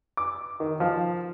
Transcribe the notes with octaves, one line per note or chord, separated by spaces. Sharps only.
D6
D#3
F3